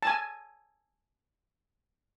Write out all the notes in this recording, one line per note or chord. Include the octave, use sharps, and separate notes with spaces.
G#5 A5